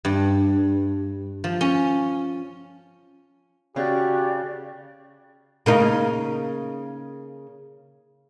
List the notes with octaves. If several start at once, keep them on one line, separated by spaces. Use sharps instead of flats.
G2
F3
C#4
C#3 C#4 F#4 G4 D5
C#3 A#3 D#4